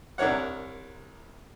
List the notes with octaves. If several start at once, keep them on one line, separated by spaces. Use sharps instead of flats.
C2 D4 A#4 C#5 F#5